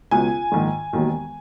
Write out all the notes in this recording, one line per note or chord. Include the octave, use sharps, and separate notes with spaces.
C#2 B2 F#3 G#5
A#1 G#2 D#3
E1 D#2 D#3 F#3